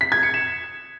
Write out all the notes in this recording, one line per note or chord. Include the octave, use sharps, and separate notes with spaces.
B6
G#6
C#7
E7